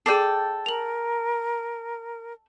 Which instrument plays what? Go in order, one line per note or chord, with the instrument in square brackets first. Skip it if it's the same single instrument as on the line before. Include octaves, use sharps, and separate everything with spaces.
[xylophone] G#4 C7 [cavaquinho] A4 D5 G5
[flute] A#4 [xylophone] F7 F#7